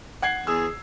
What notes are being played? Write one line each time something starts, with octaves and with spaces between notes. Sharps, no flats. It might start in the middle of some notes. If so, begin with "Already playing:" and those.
F#5 G#6 C7
E2 G#4 E6